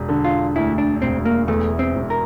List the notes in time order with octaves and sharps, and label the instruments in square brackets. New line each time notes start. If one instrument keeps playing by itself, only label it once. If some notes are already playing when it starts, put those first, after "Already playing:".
Already playing: [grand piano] E1
D3
[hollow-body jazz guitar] F4
[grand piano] D2 [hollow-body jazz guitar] E4
[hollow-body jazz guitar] D4
[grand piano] E1 [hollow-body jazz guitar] C4
[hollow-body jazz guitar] A#3
[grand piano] E2 [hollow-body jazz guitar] A3
[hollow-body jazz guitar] C4
[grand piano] E1
[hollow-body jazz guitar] A#4